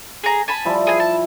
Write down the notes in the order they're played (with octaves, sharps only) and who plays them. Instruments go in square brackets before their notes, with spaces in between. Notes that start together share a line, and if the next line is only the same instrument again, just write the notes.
[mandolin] G#4 A#5
G#5 A5 B5
[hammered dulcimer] F3 G3 E4
[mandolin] G#4 G#5
A5